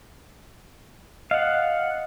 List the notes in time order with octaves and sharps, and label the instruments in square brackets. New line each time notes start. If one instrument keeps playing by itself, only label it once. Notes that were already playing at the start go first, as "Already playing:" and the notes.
[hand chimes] D#5 [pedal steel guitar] F5 F#5